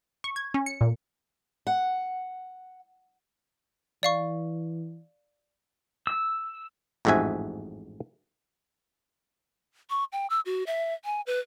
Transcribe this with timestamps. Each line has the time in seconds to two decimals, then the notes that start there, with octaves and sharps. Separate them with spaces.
0.24 C#6
0.36 G#6
0.54 C#4
0.66 C#7
0.81 A#2
1.67 F#5
4.03 E3 D5 F5 C#6
6.07 E6
7.05 A1 F2 G#2 F#4 E5 G#5
9.90 C#6
10.12 G5
10.30 E6
10.45 F#4
10.67 E5
11.04 G#5
11.27 B4